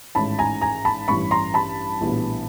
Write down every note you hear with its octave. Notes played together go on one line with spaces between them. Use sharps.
A1 G#2 D#3 A5 B5
G#5 A#5
G#5 A#5
A5 B5
A1 G2 E3 B5 C#6
A#5 C6
A5 B5
A#1 A2 E3 G3 B3